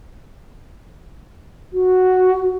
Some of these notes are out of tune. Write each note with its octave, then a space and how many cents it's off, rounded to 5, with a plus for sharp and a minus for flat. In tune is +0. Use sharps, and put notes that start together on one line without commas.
F#4 +0